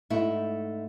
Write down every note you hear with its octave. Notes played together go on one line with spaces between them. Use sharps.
G#2 A3 D#4 E4 F#4